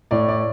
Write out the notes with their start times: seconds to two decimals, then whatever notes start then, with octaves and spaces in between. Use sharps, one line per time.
0.11 A2 D5
0.29 D5